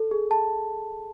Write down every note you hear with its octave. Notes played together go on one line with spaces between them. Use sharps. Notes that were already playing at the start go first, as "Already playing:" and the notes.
Already playing: A4
G#4
A5